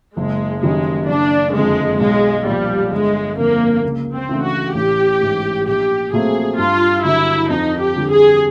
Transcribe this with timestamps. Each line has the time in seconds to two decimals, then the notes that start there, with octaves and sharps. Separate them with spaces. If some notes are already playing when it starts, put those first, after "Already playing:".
0.17 F#1 G#3
0.63 F#2 D#3 G3 G#3
1.08 F#1 D4
1.54 F2 D3 G#3
1.99 B1 G#3
2.46 A#2 F3 G3
2.91 G1 G#3
3.37 F2 D3 F3 A#3
3.84 C#2
4.14 C4
4.29 C#3 E3 A3 D4
4.45 F#4
4.75 A1 G4
5.21 G#2 E3
5.67 A#1 G4
6.13 A#2 F#3 A3 C4 G#4
6.58 G2 F4
7.04 D3 F#3 E4
7.50 F2 D#4
7.80 G4
7.96 D3 G3
8.11 G#4